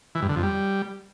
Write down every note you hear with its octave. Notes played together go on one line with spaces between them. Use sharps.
E3
G2
D3
F2
G3